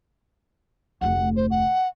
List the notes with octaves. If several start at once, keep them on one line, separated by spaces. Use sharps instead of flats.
F1 D2 F#5
C5
F#5